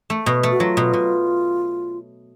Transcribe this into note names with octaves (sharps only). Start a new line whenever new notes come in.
A3
B2
A3
F#4
F#3 F4
B2
B2